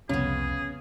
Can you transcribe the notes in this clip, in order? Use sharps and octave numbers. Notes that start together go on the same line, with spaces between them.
C2 F2 C#3 B3 C#4 G#4